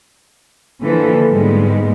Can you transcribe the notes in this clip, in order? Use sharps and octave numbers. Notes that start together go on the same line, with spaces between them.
D3 E3 F3 A#3 A4
G#2 G3 G#3 A#3 B3